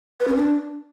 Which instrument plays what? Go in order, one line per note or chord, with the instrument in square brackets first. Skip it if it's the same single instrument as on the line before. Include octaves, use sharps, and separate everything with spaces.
[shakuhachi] B4
C#4
D4